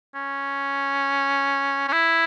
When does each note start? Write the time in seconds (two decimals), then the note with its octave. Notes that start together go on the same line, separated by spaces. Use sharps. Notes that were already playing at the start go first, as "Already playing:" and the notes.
0.15 C#4
1.88 C#4
1.92 E4